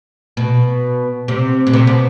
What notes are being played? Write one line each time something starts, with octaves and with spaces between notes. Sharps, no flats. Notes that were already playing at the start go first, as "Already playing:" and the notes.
B2
C3
B2
C3
B2